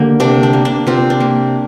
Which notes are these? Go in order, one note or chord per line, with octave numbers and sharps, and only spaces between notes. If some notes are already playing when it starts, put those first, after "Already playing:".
Already playing: D3 A#3 G4
C3 D4
D4
A#3
D4
C3 C4 F4
D4
A#3